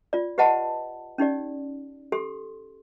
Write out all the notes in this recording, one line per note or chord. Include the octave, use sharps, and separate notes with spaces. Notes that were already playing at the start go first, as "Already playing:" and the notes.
F4 D5
G4 B4 D#5 F#5 A5 B5
C#4 D#4 G4 D5
G4 A4 C6